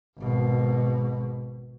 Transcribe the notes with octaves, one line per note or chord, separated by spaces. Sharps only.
G#1 B2